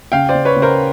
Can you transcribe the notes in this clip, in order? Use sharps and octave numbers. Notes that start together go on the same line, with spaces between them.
C#3 F5 G5
C5 D5
C#3
B4 C#5
C#3
A#4 C5